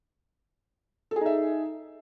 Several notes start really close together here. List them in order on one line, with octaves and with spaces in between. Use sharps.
A4 G#4 D#4 E5